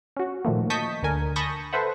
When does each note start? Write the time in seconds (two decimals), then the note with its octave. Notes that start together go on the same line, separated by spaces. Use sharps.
0.17 C#4 F#4
0.45 A#2 D#3 F3 A3 A#3
0.70 D#5 A5 C#6 D#6 G6 B6
1.02 D2 D3 A#4 G#5
1.36 A5 B5 C#6 D#6 G6 A#6
1.73 A4 B4 C5 E5 F#5